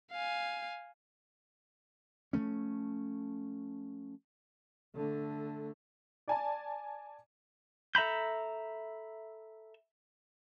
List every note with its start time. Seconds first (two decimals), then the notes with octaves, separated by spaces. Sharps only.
0.12 F5 G#5
2.33 F3 F#3 A3 C#4
4.95 D3 A3
6.28 D5 G#5 A5
7.95 A4 E5 A#5 B5 G6